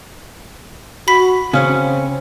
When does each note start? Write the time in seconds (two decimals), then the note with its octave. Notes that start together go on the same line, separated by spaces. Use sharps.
1.08 F#4 B5 B6
1.53 C#3 C4 C#4